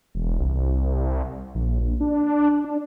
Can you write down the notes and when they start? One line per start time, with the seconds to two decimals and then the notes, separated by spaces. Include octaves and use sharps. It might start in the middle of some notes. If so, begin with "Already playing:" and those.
0.15 E1
0.39 C2
1.55 A#1
1.81 A#1
2.00 D4
2.64 D4